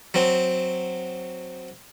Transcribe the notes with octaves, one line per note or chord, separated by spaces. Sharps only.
F#3 C4